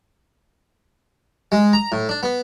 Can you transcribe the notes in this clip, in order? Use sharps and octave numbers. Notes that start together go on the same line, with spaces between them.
G#3
A#5
A2
D4
B3